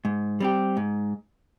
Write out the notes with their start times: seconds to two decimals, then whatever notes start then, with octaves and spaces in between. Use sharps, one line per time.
0.05 G#2
0.40 G3 C4 G4
0.77 G#2